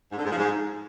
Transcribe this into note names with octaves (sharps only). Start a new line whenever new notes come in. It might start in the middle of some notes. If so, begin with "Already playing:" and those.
G#2
D3
G#2
F3
G#2